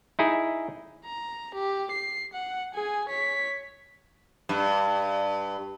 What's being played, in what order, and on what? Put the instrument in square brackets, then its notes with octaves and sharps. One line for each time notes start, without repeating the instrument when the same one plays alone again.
[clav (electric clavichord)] D#4 E4 G#4
[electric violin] A#5
G4
C7
F#5
G#4 G#5
C#5 B6
[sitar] G2